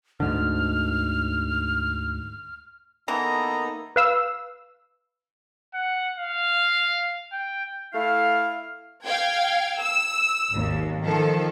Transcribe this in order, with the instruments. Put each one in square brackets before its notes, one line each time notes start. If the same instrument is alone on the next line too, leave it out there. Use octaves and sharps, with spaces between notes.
[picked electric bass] D2 G#2 D3 [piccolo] F6
[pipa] E3 [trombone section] A#3 D#4 A4 [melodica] B3 [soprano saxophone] A#5
[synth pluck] B4 F5 E6
[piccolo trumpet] F#5
F5
G5
[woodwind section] A3 E4 F5
[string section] F5 G5 G#6
E6
G#1 D#2
D#3 F3 A4